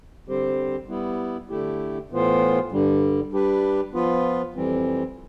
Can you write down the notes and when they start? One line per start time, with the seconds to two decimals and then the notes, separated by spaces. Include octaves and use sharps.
0.28 D3 G3 C4 G4 C5
0.88 G3 B3 E4
1.50 D3 A3 E4 G4
2.10 A2 E3 B3 F4 C5
2.72 G2 D3 G3
3.32 G3 D4 G4 B4
3.94 F3 B3 F4 B4
4.54 F2 E3 G3 C4